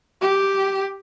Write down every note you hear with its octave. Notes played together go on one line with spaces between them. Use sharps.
G4